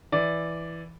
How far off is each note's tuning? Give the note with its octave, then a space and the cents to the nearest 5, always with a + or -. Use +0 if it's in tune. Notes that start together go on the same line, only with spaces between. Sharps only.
E3 +0 D5 +0